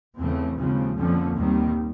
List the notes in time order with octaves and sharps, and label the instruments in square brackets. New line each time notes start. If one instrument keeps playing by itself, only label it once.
[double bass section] E2 C#3 E3 A3 C4
D#2 C#3 F3 G#3 C4
F2 D3 F3 A#3 C#4
D#2 D#3 G3 C4